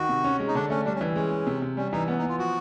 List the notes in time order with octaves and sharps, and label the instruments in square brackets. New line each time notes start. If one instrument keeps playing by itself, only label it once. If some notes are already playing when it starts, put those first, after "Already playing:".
Already playing: [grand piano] D#3 [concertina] F#4
[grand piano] C3
C#4
G#3
[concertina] D#4
[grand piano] D3 [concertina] D4
[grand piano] A3 [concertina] C#4
[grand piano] G3 [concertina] D4
[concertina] C#4
[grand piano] E3
[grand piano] G#3 [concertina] C#4
[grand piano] G#3
C3
C3
[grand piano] G3 [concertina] C#4
[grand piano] E3 [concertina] D#4
[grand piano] B3 [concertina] C#4
[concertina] D#4
[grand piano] B3
[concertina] F4
[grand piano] F3 [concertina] F#4